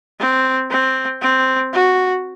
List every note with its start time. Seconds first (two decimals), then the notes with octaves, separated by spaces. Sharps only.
0.20 C4
0.70 C4
1.22 C4
1.73 F#4